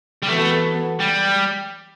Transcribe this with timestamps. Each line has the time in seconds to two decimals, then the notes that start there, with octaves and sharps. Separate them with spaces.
0.22 G3
0.28 E3 A3 B3 F#4 A4
1.00 G3